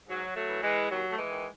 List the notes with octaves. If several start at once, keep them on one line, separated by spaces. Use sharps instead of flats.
G#2 F#3
F#3 A3
E3
E3 G#3
D#2 F#3
A3
E3 G#3
D#3